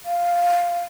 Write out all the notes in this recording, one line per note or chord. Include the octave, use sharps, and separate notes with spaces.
F5